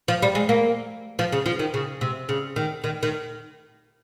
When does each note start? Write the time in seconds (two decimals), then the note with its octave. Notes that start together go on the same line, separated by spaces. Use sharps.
0.08 F3
0.22 G3
0.35 G#3
0.49 A#3
1.19 F3
1.32 C#3
1.46 F3
1.59 D#3
1.74 C#3
2.01 C3
2.29 C#3
2.56 D#3
2.84 D#3
3.03 D#3